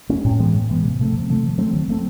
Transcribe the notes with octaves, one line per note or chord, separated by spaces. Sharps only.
G#3 C#4
A2
E3 G#3 B3
A2
E3 G#3 B3
C3
F3 A3 C4
C3
F3 A3 C4
D#3
F#3 A3 C4
D#3
F#3 A3 C4